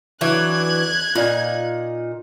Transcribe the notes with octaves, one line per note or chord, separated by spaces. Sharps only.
E3 F#3 D4 F#6 G#6
A#2 D#4 F4 D5